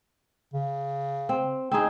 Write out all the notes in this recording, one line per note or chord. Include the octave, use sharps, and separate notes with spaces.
C#3
C4
C4 D#4 G#4